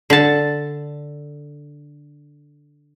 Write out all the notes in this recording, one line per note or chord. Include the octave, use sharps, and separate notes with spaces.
D3 A5